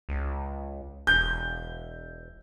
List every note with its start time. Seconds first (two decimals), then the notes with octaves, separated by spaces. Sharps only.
0.09 C#2
1.07 E1 G6